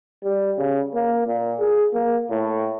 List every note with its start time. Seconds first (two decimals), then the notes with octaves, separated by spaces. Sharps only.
0.23 G3
0.58 C#3
0.94 A#3
1.27 A#2
1.59 G#4
1.94 A#3
2.30 A2